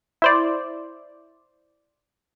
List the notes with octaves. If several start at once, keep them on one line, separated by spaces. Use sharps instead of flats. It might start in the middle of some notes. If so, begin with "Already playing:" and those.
E4 C5 D5